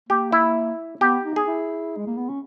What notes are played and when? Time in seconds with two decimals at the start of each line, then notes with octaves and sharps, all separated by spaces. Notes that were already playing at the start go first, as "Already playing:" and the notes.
0.09 A#3 G4
0.32 E4
1.01 B3 G4
1.24 D#4
1.36 G#4
1.47 E4
1.97 G#3
2.07 A#3
2.18 B3
2.29 C#4